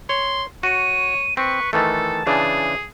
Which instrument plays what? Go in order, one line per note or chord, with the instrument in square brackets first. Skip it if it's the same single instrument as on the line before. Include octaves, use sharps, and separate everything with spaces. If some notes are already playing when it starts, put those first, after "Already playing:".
[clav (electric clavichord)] C#5 [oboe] C6
[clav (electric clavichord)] F#4 [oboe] C#5 [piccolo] D#7
[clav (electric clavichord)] C4 [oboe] B4 [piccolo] C#6
[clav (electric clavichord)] D#3 E3 A3 [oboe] A4 [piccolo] A5
[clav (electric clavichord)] C#3 E3 D4 [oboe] G#4